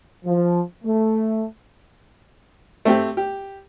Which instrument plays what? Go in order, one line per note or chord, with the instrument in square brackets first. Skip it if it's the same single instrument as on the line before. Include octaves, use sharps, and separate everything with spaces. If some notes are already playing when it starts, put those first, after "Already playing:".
[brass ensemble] F3
A3
[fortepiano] A3 C4 G4
G4